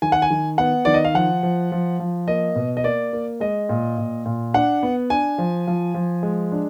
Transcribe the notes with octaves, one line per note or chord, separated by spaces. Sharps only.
D#3 G#5
F#5
G#5
D#3
B3 F#5
D#3 D5
D#5
F5
F3 F#5
F3
F3
F3
A#3 D#5
B2
D#5
A#3 D5
A#3
G#3 D#5
A#2
A#2
A#2
D4 F#5
B3
D4 G#5
F3
F3
F3
G#3
D4